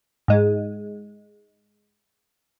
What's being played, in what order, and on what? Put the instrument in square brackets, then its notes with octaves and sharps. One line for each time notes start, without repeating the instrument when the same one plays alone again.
[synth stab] G#2 G#3